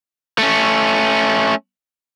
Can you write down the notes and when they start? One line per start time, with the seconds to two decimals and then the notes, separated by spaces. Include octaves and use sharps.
0.38 A3 C#4